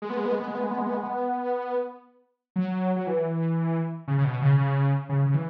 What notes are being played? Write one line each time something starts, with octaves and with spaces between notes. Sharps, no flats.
G#3
B3
G#3
B3
G#3
B3
G#3
B3
G#3
B3
G#3
B3
G#3
B3
F#3
F#3
E3
C#3
C#3
B2
C#3
C#3
C#3
C#3
E3